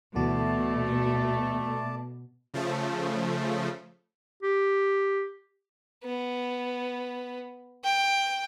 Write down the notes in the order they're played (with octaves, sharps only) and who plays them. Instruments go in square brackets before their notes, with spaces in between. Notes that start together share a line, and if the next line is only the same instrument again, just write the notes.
[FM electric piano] D2 E3 F#4 [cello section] B2 [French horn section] A3 [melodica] D5 A5
[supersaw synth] C#3 F3 A3
[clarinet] G4
[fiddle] B3
G5